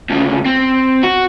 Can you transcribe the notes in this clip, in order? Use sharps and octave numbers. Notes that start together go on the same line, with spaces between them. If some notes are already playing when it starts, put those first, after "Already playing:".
D2 C#3
C4
F#4